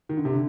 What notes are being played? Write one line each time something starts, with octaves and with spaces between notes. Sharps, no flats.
D#3
D3
C3
D3